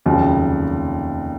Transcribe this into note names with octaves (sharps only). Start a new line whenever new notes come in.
F1 D#2 C#3 F#3